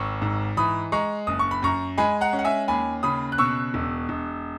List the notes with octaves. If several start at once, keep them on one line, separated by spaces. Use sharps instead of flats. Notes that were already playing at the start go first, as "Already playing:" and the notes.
Already playing: G#1 C#6 E6
G#2
E3 B5 D#6
G#3 A#5 C#6
F#1 D#6
C#6
B5
F#2 A#5 C#6
G#3 G#5 B5
F#5 A#5
C#4
F#5
E5 G#5
D#2 G#5 B5
C#3 B5 D#6
F#6
B2 C#6 E6
E1
E1